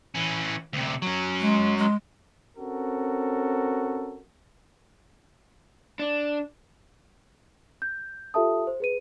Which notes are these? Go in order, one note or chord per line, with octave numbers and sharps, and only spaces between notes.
E3 C#4
D2 C3
F#3 C#4
G#3
G#3
C4 C#4 F#4 A4 A#4
D4
G6
F4 G4 A4 E5 A5 D#6
C5
G#4 B4 D#7